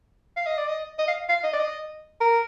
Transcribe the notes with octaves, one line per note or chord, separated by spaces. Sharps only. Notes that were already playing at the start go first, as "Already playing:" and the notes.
F5
D#5
D5
D#5
D#5
F5
F5
D#5
D5
D#5
A#4